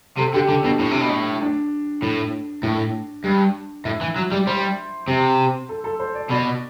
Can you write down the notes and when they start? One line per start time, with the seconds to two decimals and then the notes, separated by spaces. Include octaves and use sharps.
0.18 C3 A4
0.34 D3 G4
0.48 D3 A4
0.64 B2 D4
0.79 A2
0.91 C3
1.01 B2
1.10 A2
1.41 D4
2.02 A2
2.63 A2
3.24 G2
3.85 A2 E4
4.01 E3
4.16 F#3
4.32 G3
4.47 G3 C5
5.08 C3
5.69 A4
5.84 A4
6.00 C5
6.15 D5
6.30 B2 D5